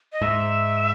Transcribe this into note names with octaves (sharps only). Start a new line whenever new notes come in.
D#5
G#2 E5